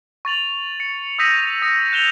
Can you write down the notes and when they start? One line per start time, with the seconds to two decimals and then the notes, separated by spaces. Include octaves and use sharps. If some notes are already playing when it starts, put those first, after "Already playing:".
0.25 C#6 A6 F7 F#7
0.80 C#7
1.19 D#6 E6 G6 A#6 B6 D#7
1.62 D#6 A#6 C#7
1.92 F#6 G6 E7 F7 G7